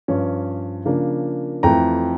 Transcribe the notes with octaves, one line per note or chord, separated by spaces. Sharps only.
G2 F3 C#4
C#3 F3 A#3 D4
F2 E3 A3 G5 A#5